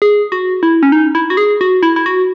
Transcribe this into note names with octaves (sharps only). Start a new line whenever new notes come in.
G#4
F#4
E4
C#4
D#4
E4
F#4
G#4
F#4
E4
E4
F#4